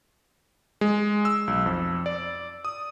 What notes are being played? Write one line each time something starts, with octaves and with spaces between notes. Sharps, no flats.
G#3
E6
B1
F2
D5
D#6